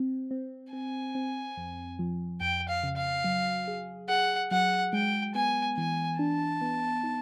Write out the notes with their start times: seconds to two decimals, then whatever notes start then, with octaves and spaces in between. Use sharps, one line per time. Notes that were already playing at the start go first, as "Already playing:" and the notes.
Already playing: C4
0.31 C4
0.73 C4 G#5
1.15 C4
1.57 F2
1.99 F3
2.41 F2 G5
2.69 F5
2.83 C#3
2.97 F5
3.24 F#3
3.68 G#4
4.09 G#4 F#5
4.51 F#3 F#5
4.93 G#3 G5
5.35 B3 G#5
5.77 E3 G#5
6.19 D4 A5
6.61 B3
7.03 D#4